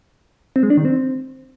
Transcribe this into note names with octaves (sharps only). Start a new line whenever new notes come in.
C4
G#3
D4
D#3
C4